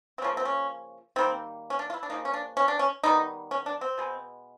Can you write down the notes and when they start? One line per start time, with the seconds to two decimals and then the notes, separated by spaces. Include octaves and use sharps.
0.18 C4
0.22 C#3 F3 A#3 C#4
0.37 C4
0.45 C#4
1.16 D#3 G3 A#3 C4
1.70 C#4
1.79 D4
1.90 F4
1.94 E4
2.03 D4
2.10 C#3 F3 A#3 D#4
2.25 C#4
2.34 D4
2.57 C#4
2.68 D4
2.79 C#4
3.03 D#3 G3 B3 D#4
3.51 C#4
3.66 D4
3.81 C4
3.97 B2 G#3 B3